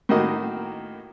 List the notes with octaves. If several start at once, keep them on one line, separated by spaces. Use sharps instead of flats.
A2 D#3 A#3 F#4 D#5